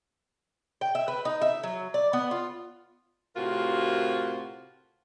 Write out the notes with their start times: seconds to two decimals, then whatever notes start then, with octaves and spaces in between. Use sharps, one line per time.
0.81 G5
0.95 E5
1.08 B4
1.25 D#4
1.42 E5
1.63 F#3
1.94 D5
2.13 B3
2.31 F4
3.37 A2 C3 F4 F#4 A#4